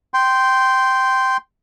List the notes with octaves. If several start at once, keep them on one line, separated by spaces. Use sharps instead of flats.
G5 C6